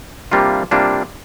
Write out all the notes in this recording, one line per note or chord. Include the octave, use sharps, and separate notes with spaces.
C3 G3 A#3 D4 F4
C3 G3 A#3 D4 F4